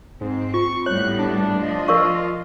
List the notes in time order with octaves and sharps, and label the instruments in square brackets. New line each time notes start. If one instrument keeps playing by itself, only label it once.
[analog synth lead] G#2 [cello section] C4
[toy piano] F4 [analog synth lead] C#6
[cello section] A2 G3 B3 [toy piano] C#5 [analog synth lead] F#6
[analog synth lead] D4
[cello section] F3 D#5
[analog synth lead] F4 [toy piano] A#4 D5 C#6